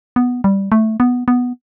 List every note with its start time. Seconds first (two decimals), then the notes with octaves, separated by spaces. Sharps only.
0.16 B3
0.44 G3
0.72 A3
1.00 B3
1.28 B3